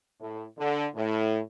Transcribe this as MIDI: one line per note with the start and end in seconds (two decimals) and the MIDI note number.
0.20 0.43 45
0.58 0.86 50
0.95 1.38 45